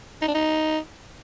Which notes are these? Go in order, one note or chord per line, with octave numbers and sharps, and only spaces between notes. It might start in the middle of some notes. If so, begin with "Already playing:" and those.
D#4
D4
D#4